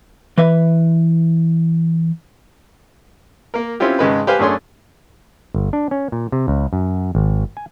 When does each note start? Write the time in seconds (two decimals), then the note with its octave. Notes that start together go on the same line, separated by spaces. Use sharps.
0.38 E3 B4 E5
3.54 A#3 A#4
3.80 C4 C#4 E4 F4 G4
3.99 G#1 C#3 G#3 B4
4.27 G4 B4 C5 F5 G#5
4.39 F#2 A3 D4 G#4 C#5 C6
5.54 G1
5.73 D4
5.91 C#4
6.12 A#2
6.32 C3
6.48 C#2
6.73 F#2
7.15 G#1
7.57 G#5